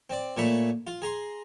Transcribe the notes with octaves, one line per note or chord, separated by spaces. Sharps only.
C4 D5
A#2 A3 C#5 E5 B5
F4
G#4 A#5 C6